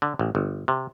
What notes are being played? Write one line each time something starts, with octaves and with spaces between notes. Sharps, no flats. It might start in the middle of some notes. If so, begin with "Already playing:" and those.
D3
A1
G1
C3